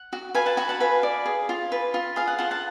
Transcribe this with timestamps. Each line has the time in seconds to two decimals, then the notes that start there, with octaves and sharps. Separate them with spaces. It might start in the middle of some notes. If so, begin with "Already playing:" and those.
Already playing: F#5
0.13 F#4
0.35 B4 F5 G#5
0.46 F#5 A5
0.57 F#4 G#5 B5
0.69 F#5 A5
0.80 B4 F5 G#5
1.03 D5
1.25 G#4
1.49 F4
1.72 B4
1.94 F4
2.16 G#4 F5
2.27 F#5
2.39 F4 F#5 A5
2.51 F#5 A5